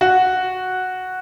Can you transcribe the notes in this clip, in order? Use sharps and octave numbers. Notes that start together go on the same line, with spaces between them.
F#4